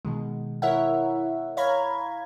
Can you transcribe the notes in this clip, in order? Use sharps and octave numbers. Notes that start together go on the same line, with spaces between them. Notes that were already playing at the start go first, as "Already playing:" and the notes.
B2 D#3 G#3
E4 A#4 C#5 E5 F#5
C#5 F5 A#5 B5 G#6